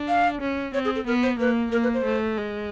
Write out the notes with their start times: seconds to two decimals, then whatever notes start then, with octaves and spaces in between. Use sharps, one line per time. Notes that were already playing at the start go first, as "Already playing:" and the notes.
Already playing: D4
0.08 F5
0.41 C#4
0.74 C4 C#5
0.85 G#4
0.95 A4
1.07 B3 A#4
1.23 C5
1.39 A#3 B4
1.71 A#3 A#4
1.83 B4
1.94 C5
2.05 A3
2.37 G#3